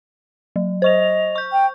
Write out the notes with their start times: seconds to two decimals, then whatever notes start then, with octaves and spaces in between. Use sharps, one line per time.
0.56 F#3
0.82 C5 D#5 C#6 F7
1.35 C#6 G6
1.52 G5